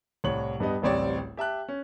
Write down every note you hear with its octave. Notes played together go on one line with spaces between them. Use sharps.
C2 A2 C#5 F#7
G2 G3 B3 D#5
D1 A1 G3 C4 C#5 D5
G4 E5 A5 F#6
C#4